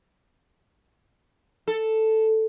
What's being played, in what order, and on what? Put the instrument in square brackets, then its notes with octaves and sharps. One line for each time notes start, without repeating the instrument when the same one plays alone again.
[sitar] A4